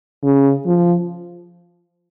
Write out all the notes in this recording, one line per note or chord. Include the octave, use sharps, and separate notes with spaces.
C#3
F3